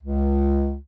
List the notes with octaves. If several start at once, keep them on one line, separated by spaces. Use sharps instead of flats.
C#2